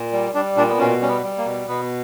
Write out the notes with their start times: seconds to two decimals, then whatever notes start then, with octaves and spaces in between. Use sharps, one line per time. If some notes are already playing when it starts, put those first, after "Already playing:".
Already playing: A#2
0.12 G3
0.35 G3 D4
0.57 A#2 D4
0.69 B3
0.79 B2 C#4
1.01 G3 C#4
1.09 B3
1.23 G3
1.38 A#3
1.45 B2
1.68 B2 B3